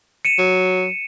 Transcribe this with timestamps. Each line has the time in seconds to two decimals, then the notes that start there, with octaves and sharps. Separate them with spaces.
0.25 C#7 D#7 E7
0.39 F#3